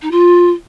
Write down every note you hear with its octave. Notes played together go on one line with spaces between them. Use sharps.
D#4
F4